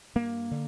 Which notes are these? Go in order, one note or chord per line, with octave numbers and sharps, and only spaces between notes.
G2 A#3
D3